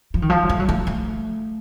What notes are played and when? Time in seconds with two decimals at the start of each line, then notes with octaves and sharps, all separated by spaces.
0.14 F3
0.22 D#3
0.30 F3
0.49 A3
0.59 F#3
0.69 A3
0.87 A3